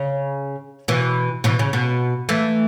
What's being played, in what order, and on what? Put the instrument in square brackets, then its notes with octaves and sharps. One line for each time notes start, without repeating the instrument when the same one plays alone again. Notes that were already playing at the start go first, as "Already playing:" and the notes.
Already playing: [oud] C#3
B2 E3
B2 E3
C#3
B2
E3 A3